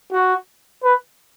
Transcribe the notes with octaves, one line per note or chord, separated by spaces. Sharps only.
F#4
B4